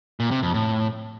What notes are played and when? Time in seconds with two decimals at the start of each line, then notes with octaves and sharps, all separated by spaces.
0.20 A#2
0.31 C3
0.43 F2
0.54 A2